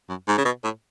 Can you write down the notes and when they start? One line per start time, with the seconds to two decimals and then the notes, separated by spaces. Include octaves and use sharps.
0.09 F#2
0.28 G#2
0.38 C#3
0.45 B2
0.64 A2